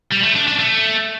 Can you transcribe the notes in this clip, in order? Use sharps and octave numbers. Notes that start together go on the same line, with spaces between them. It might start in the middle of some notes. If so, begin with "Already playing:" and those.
G3
A3
D4
D4
A3